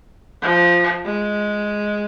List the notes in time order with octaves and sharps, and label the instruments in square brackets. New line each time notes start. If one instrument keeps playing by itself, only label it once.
[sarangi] F3
G#3